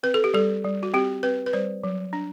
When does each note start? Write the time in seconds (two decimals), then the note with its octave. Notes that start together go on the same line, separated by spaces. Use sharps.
0.03 C4 B4
0.14 A4
0.24 G4
0.34 G3 A4
0.64 G3
0.83 F#4
0.94 C4 G4
1.23 C4 B4
1.46 B4
1.53 G3 C5
1.84 F#3
2.13 D4